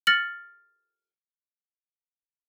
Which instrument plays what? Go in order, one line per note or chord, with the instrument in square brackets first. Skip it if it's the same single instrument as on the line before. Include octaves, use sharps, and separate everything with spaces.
[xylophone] F6 A6 A#6 C#7 F#7